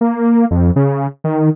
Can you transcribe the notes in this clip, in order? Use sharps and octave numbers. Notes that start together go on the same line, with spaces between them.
A#3
F2
C#3
D#3